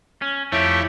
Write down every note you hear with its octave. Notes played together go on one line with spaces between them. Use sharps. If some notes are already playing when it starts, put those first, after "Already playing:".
C#4
F2 A3 E4 G4 C#5